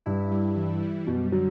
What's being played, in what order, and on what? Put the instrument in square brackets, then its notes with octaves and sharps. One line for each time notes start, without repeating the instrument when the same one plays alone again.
[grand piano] G2 [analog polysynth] E4
[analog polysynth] G3
E3
G3
[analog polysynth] F#2 [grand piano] B2
[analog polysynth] D3 [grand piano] F#3